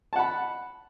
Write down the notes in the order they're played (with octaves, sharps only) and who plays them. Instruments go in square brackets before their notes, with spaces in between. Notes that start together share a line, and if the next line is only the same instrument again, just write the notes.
[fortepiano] A5
F#5
B5